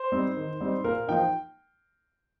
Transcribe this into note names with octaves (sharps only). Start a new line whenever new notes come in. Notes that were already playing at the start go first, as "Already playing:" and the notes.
Already playing: C5
G3 C4 D#4
D#3
G3 C4 D#4
A#2 A#4
F3 A#3 D#4 G5